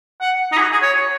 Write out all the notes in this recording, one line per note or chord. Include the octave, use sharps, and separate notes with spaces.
F#5
D#4
G#4
F#4
G#4
C#5